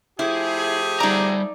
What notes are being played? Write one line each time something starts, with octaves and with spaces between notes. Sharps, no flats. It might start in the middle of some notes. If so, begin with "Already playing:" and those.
F3 A3 E4 G4 G#4
G3 D#4 D5 A#5